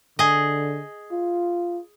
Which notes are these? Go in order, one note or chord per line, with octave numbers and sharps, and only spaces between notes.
D3 G#4 D#5
F4